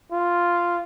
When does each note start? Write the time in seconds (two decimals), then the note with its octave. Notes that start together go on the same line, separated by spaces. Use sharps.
0.11 F4